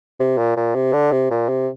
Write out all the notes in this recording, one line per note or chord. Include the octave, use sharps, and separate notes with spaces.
C3
A#2
A#2
C3
D3
C3
A#2
C3